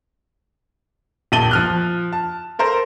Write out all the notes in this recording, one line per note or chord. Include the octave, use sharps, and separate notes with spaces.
D#1 A#1 A5 D#7 F#7 G7
F3 F6 F#6
A5
A4 A#4 C5